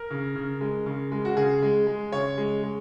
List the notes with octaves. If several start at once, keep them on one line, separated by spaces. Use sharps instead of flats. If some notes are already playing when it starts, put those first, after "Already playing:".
Already playing: A#4
C#3
C#3
G#3
C#3
G#3
F#4
C#3 G#4
G#3
G#3
C#3 C#5
G#3
G#3